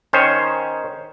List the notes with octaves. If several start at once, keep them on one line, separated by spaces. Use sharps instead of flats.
D#3 C#4 C5 C#5